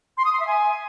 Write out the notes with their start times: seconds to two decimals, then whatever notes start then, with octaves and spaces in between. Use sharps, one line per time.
0.17 C6
0.25 D#6
0.32 C6
0.40 E5
0.47 G#5